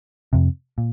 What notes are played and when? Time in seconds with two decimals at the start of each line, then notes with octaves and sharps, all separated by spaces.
0.33 F2 C3
0.78 A#2